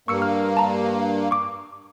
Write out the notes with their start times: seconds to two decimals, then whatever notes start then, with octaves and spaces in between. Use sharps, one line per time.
0.08 G2 A#3 C#6 E6 C#7
0.22 F6
0.57 A5 A#5
1.31 C#6 D6